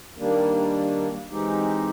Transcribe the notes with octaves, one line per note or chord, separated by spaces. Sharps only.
D#3 G3 A#3 D4
E3 G#3 C4 D#4 G4